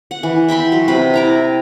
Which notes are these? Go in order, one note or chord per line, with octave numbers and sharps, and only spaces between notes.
F#5
E3
E5 G5 B5 C6
F#3
C3 B4 B5
E4 A#5 D6